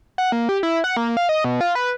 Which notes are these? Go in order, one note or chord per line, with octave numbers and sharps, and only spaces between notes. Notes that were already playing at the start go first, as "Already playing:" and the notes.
F#5
A#3
G4
E4
F#5
A#3
F5
D#5
B2
F4
B4